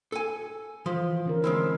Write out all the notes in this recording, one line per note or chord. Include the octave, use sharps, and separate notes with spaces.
A4 G#5
E3 F3
D3 C#4 A#4
G#3 A#3 C4 E4